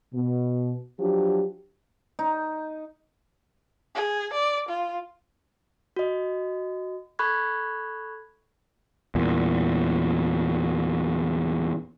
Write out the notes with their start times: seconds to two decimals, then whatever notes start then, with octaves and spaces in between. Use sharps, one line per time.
0.14 B2
1.00 F3 F#3 D4 G4
2.19 D#4
3.95 G#4
4.34 D5
4.69 F4
5.96 F#4 D#5
7.19 A4 B5 C#6 F#6 G#6
9.15 E2 A#2